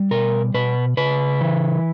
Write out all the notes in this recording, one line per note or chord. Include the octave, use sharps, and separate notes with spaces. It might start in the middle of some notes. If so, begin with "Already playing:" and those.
Already playing: G3
B2 A#4
B2 B4
C#3 B4
E3